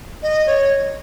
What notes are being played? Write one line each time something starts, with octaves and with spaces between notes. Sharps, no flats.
D#5
C#5